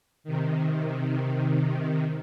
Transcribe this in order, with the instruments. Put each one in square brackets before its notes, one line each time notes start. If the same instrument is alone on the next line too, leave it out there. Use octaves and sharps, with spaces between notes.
[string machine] C3 D#3